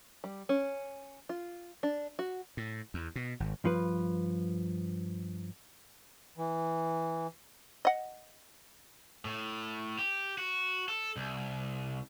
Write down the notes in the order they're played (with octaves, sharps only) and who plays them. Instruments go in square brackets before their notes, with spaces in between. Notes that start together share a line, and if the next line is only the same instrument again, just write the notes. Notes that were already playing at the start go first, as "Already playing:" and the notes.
[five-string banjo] G3
C#4
F4
D4
F#4
[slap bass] A2
E2
B2
G#1
[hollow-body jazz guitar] G2 F3 B4
[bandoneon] E3
[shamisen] D#5 F#5
[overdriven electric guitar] A2
G4
F#4
A4
C2